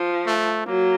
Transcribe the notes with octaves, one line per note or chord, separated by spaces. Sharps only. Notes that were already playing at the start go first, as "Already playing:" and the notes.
Already playing: F3
A3
F#3 A#3